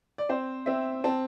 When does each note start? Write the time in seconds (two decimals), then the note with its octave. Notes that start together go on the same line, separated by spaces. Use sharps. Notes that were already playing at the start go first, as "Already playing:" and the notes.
0.18 D5
0.29 C4 C5
0.66 C4 E5
1.04 C4 A5